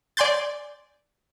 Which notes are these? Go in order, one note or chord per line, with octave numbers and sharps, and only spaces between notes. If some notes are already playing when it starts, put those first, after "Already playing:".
D5 G#5 C6 G6 A6